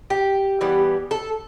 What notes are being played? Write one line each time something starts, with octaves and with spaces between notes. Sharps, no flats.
G4
E3 G3 B3
A4